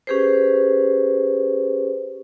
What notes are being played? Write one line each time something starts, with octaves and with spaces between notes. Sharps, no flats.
C#4 G4 G#4 B4 C5